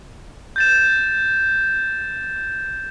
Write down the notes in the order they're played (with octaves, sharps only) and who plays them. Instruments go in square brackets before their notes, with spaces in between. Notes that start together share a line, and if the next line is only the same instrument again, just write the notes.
[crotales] G6 A6 E7